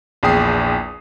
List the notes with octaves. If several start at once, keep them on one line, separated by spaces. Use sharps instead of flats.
A#1 E2 G#4 G5 D#6 C7